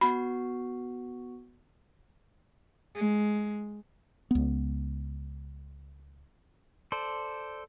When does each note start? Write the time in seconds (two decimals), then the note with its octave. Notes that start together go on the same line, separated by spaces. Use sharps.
0.01 B3 F#4 B5
2.95 G#3
4.31 C#2 B3
6.92 A4 C5 D5